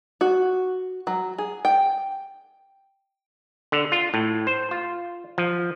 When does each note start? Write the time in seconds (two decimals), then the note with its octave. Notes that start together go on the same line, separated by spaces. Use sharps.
0.21 F#4
1.07 F#3
1.38 G#4
1.65 G5
3.72 D3
3.92 F4
4.14 A2
4.47 C5
4.71 F4
5.38 F3